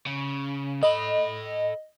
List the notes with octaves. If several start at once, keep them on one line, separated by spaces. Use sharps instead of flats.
C#3
A4 D#5 B5